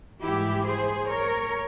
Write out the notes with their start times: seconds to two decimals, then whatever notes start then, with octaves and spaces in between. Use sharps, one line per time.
0.22 G#2 E3 G3 E4 G4
0.65 G#4 C5
1.08 A#4 C#5